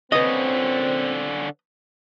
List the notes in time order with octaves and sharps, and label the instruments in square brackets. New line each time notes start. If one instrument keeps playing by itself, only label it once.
[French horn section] A#2 C4 [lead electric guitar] D3 C#4 [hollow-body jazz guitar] B4 D#5